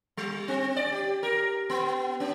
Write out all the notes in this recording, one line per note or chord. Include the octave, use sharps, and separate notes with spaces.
G3
C4
D5
G4
A#4
B3
C#4